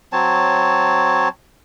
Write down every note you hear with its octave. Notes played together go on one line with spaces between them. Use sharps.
F#3 C4 C#5 A5